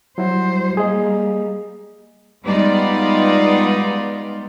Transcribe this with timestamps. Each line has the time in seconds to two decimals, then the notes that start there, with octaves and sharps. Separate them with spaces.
0.18 F#3 G3 E4 F#4 C5
0.77 G3 A#3 G#4 D#5
2.44 G3 G#3 B3 D#4 F4 D5